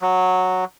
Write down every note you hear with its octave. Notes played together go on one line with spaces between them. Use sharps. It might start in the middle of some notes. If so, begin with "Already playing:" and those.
F#3